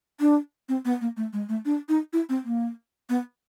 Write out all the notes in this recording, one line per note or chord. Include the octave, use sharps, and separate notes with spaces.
D4
C4
B3
A#3
A3
G#3
A3
D4
D#4
E4
C4
A#3
B3